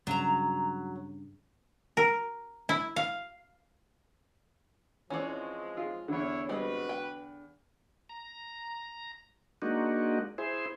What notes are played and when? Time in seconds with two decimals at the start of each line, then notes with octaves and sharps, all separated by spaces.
0.07 G2 C#3 F#3 A#5
1.97 A#4
2.69 E4
2.96 F5
5.10 E3 F3 G#3 C4 C#4 C#5 D5
5.76 F4 G#4
6.08 E2 D3 E4 C#5
6.49 G3 G#3 C4 F#4 B4
6.89 G5
8.09 A#5
9.62 G#3 A#3 D4 D#4 F#4
10.38 E4 G#4 C5